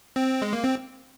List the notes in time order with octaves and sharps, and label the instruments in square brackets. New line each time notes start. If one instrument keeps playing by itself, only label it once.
[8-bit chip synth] C4
G#3
A#3
C4